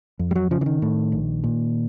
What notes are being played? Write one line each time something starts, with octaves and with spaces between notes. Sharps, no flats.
F2
G3
F#3
C#3 F3
E3
D#3
A2
A#1
A#2